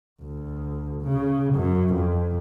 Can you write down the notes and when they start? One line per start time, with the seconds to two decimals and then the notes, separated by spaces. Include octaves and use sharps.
0.22 D2
1.03 C#3
1.55 F#2
1.95 F2